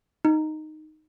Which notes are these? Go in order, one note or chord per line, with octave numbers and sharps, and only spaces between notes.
D#4